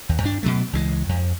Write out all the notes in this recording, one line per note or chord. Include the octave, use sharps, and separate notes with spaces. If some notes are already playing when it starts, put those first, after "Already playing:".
D#2
G2 D4
B2 D3 F#3 A3
C#2 E3 F3 G#3
F2